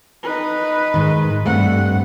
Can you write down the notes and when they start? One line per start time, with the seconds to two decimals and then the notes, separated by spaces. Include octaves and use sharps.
0.23 D#4 B4
0.94 G#2 D#3
1.46 G2 A3 C4 F#5